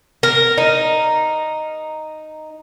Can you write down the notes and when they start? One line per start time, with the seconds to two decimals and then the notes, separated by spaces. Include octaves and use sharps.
0.23 A#4
0.58 D#4